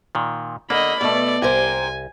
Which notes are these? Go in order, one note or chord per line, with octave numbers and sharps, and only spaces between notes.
A#2 D#3
D3 A#3 D#5 B5
B2 A3 D5
C2 G4 A#4 C5 G#5